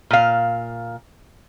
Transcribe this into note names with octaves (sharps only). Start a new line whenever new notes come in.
A#2 F5